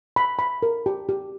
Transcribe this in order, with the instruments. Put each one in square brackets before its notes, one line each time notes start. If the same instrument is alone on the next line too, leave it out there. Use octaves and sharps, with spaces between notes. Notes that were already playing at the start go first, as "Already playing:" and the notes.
[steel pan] B5
B5
A#4
G4
G4